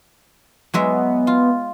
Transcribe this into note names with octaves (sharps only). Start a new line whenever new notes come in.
F#3 G#3 B3 E5
F4